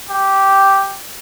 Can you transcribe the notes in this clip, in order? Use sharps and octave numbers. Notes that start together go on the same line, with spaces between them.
G4